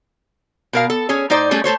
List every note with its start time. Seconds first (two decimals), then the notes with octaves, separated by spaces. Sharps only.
0.73 B2 A#4 F5
0.90 A4
1.09 C#4 G#4 C#5
1.30 A2 D#4 C5 D5
1.51 G3 A3 C#4 G#4
1.64 A3 A4 C5 C#5